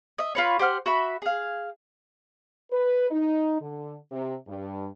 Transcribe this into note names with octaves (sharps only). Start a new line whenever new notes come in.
D#5 E5
F4 B4 C#5
G4 C5 F#5 F6
F#4 E5 B5
G#4 F5
B4
D#4
D3
C3
G2